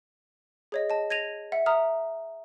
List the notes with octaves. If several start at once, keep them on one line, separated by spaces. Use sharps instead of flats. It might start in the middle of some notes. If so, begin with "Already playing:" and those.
G#4 C#5 D#5
D#5 A5
G#6 A#6 D#7 F7
E5 F#5
E5 A#5 D#6 F6